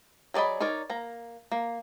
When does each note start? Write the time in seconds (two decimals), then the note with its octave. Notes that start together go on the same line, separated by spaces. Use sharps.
0.34 F#3 G#4 D5 D#5 B5
0.60 D#4 A#4 C#5 D5
0.90 A#3 A#5
1.52 A#3